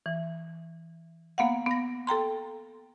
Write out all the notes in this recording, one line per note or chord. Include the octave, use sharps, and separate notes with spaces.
E3
A#3 B3 F5 F#5
B3 A#6
A4 G5 A#5 C6